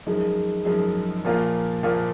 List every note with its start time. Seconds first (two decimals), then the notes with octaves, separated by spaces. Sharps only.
0.06 F#2 F3 G#3 D#4 G#4
0.65 F#2 F3 G#3 D#4 G#4
1.25 A#2 F3 A#3 F4
1.83 A#2 F3 A#3 F4